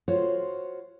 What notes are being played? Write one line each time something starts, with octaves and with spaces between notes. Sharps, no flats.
F4 F#4 C5 C#5 F5